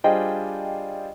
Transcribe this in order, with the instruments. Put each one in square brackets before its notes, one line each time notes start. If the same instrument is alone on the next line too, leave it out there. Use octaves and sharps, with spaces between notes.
[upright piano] G3 D4 F4 G#4 C5 [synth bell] D#5 G5